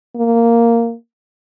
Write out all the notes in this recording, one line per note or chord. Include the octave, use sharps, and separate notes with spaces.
A#3